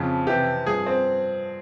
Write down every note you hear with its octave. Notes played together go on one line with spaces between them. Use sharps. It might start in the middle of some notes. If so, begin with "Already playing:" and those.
Already playing: F2 C#3 F3
F2 C3 E3 G4
G2 F3 G#4
C4